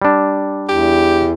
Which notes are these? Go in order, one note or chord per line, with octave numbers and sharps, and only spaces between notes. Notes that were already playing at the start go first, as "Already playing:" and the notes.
G3 D4
E2 G4